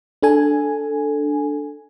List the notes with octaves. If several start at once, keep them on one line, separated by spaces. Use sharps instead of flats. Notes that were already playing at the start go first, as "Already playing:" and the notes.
D4 A4 G#5